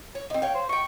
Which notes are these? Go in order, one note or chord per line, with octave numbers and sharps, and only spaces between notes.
C#5
C4 D#4
C#5 F5 G5
C5
D#5 G5 C#6